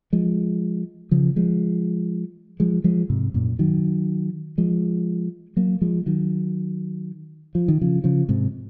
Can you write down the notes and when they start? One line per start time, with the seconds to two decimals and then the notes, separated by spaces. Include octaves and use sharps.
0.13 F3 G#3
1.11 C#3 F3
1.36 F3 G#3
2.60 F3 G#3
2.84 F3 G#3
3.10 G#2 C3
3.34 F#2 A#2
3.59 D#3 F#3
4.58 F3 G#3
5.57 F#3 A#3
5.81 F3 G#3
6.06 D#3 F#3
7.55 F3
7.68 D#3
7.82 C#3 F3
8.04 C#3 F3
8.29 G#2 C3